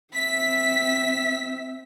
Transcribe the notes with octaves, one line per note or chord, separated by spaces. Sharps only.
C4 E5 B6